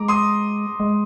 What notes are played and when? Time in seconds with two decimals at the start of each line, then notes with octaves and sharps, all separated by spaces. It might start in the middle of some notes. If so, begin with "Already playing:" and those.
Already playing: G#3 A#5 D6
0.08 C6 D#6
0.80 G#3